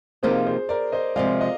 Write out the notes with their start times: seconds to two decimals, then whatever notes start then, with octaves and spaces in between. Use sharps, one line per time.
0.23 C3 F3 A#3 D#4 G4 G#4 C5
0.46 G#4 C5
0.69 A#4 D5
0.92 C5 D#5
1.16 C3 F3 G#3 D5 F5
1.41 D#5